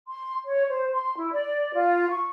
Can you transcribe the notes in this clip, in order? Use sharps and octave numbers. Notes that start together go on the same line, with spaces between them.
C6
C#5
C5
C6
E4
D5
F4
C#6